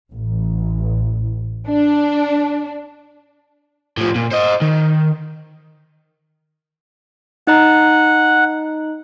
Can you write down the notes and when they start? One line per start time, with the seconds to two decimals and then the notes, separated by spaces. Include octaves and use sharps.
0.11 A1
1.69 D4
3.98 A2 F3
4.16 A#2
4.32 C5 D#5
4.61 D#3
7.47 D#4 D#5 F#5 A#5